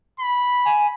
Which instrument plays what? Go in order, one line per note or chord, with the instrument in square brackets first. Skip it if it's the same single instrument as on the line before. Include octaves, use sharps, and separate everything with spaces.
[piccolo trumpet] B5
[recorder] G#5